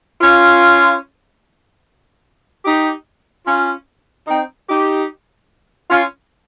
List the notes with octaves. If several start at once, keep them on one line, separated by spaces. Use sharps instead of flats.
C#4 F4
D#4 G4
C#4 F4
C4 D#4
D#4 G4
C#4 F4